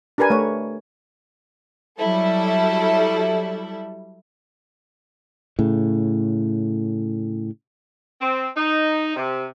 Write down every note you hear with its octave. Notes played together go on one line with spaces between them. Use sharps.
D4 G4 A#4 B4 G#5
A3 C#5
F#3 G3 E4 A4
A2 C#3
C4
D#4
C3